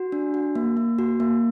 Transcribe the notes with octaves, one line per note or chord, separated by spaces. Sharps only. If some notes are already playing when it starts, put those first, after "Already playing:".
Already playing: F#4
D4
F#4
A#3
A#3
F#4
A#3